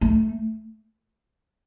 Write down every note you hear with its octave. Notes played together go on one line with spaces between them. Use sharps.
A3